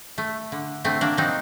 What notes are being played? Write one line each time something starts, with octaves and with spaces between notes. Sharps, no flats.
A3
D3
D3 A3 C4
A#3 D4
F#3 C4 D#4